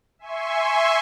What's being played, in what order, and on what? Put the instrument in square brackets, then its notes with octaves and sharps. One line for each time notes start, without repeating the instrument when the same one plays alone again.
[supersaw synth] E5 G#5 C6 C#6